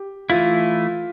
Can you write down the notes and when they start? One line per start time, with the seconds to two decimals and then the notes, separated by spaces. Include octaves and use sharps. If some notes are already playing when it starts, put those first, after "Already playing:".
Already playing: G4
0.30 E3 A3 E4 F4